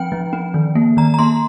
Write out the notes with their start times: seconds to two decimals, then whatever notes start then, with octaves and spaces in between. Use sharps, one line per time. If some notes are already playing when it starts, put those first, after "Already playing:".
Already playing: F3 C4 G5
0.12 F3
0.33 C4
0.54 D#3
0.75 A#3
0.97 D#3 A#5
1.14 A#5
1.19 A#3 C6